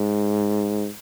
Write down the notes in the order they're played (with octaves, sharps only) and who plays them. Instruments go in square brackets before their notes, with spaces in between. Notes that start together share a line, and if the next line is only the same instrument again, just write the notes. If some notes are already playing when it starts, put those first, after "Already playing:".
Already playing: [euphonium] G#2